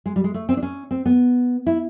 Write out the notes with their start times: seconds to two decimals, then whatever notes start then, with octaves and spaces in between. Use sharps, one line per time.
0.06 G#3
0.16 G3
0.24 G#3
0.34 A3
0.49 C4
0.57 D4
0.63 C#4
0.91 C4
1.06 B3
1.67 E4